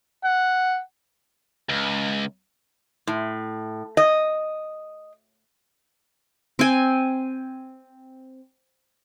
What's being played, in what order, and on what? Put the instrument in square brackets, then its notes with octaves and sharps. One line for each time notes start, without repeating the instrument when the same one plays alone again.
[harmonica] F#5
[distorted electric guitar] C#2
[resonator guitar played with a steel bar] A2
D#5
[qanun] C4 G#5